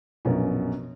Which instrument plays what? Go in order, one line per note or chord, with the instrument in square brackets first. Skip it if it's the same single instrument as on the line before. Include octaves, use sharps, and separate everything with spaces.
[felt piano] A#1 F#2 B2